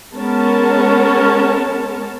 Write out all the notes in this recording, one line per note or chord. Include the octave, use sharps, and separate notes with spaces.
G#3 B3 C#4 A#4 A5